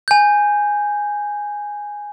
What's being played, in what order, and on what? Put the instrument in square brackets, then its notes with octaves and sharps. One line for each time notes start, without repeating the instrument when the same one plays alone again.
[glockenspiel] G#5 G6